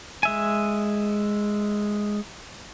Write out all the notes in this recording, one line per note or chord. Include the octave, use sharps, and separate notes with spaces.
G#3 E5 G#5